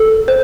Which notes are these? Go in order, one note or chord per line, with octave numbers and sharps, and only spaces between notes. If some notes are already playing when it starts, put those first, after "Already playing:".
Already playing: A4
C5